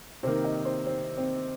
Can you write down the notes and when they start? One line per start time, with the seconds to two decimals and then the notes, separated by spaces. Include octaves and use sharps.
0.23 C3 D#3 A#3 C5
0.44 D#5
0.65 C5
0.86 C4
1.17 C4